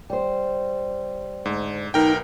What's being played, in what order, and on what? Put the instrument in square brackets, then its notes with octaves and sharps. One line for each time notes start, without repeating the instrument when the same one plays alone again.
[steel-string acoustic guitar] G3 C5
[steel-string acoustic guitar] D2 [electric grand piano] G#2
[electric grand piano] B1 A#4 G5 [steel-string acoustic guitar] B3 [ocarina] D#4